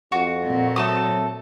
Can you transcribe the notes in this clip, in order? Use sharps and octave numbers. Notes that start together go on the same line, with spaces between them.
F2 F#4
A#2 C4
F#3 A3 A4 D#6